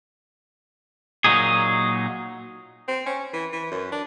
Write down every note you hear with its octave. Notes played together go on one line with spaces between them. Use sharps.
A#2 F#3 D#4 G#4
C4
C#4
E3
E3
F#2
D4